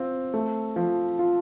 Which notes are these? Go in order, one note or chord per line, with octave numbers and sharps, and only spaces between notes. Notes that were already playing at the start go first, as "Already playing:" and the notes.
Already playing: C4 F4
A3
F3
F4